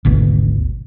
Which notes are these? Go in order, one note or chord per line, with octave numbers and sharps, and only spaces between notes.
G#1 D2 B2